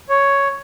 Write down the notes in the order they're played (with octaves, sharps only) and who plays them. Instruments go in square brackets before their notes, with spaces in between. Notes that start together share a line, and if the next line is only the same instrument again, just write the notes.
[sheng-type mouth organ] C#5